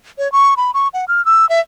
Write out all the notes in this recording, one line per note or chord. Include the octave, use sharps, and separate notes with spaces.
C#5
C#6
B5
C#6
F#5
F6
E6
E5